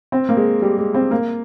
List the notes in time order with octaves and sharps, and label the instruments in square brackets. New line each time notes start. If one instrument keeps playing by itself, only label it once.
[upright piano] C4
A#3
G#3
G3
G#3
C4
A#3